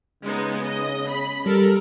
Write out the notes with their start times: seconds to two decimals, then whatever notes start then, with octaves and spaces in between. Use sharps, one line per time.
0.24 C#3 G#3 B3 D#4
0.62 D#5
1.10 B5
1.46 G3 G4 A4 A#4